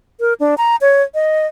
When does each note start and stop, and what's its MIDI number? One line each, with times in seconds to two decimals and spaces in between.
0.20 0.34 70
0.40 0.55 62
0.58 0.76 82
0.81 1.03 73
1.15 1.46 75